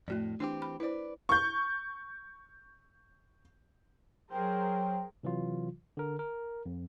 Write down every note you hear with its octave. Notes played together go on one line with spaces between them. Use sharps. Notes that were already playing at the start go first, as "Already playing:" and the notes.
F2 A2 A3 F#4 D5
E3 C4 D4 G4
B5
E4 B4 C5 D5
C#6 G6
F#3 G#4 A#4 C5 G5
C3 E3 F#3 F4
D3 A#4
A#4
F2